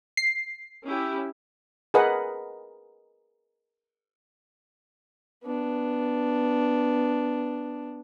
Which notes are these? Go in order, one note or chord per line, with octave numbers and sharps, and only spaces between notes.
C7
C#4 E4 G4
G#4 A#4 B4 D#5 F#5
B3 D4